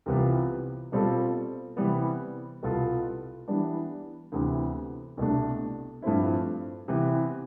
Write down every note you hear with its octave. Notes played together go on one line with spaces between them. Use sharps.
C2 C3 E3 B3 F4
B2 G3 C4 F4 A4
C3 E3 G3 B3
C2 B2 B3 F4 A4
E3 G3 B3 D4
D2 C3 E3 B3
C2 B2 A3 D4
G2 F3 A3 C4 E4
C3 E3 B3 E4